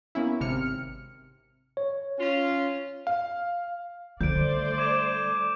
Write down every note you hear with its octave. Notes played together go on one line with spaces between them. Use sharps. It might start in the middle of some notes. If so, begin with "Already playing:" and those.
A#3 B3 C#4 E4
G#1 C3 F6 C#7
C#5
C#4 F4
F5
D3 G3 A3 C5 D5 G6 D7
D6 G#6 E7